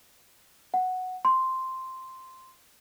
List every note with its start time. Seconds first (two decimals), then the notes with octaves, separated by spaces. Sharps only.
0.74 F#5
1.25 C6